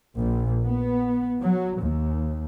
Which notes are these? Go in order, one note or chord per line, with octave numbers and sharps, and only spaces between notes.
A#1
B3
F#3
D#2